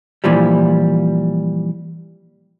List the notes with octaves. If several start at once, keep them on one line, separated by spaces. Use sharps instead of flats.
A#2 E3 F3 G3